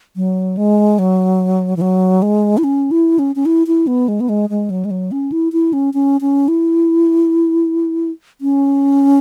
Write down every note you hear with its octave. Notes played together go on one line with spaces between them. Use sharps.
F#3
G#3
F#3
E3
F#3
G#3
E4
C#4
E4
C#4
C#4
E4
E4
B3
G#3
B3
G#3
G#3
F#3
G#3
F#3
C#4
E4
E4
C#4
C#4
C#4
E4
C#4